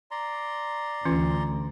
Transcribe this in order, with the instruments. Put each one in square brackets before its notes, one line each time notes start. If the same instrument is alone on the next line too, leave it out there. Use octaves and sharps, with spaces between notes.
[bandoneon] D5 A#5 C6
[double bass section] D2 [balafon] E3 C#4 F4